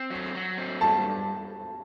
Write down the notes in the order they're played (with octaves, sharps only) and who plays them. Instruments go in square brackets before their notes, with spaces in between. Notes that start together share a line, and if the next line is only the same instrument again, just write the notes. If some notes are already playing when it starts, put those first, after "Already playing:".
Already playing: [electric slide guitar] C4
F#3
F#3
C4
[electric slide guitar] G2 [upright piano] A5